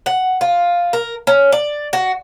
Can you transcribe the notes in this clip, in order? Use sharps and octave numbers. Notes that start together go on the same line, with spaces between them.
F#5
F4
A#4
C#4
D5
F#4